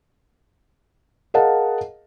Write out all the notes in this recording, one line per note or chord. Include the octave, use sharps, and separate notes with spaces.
G#4 A#4 D#5 F5 F#5 A5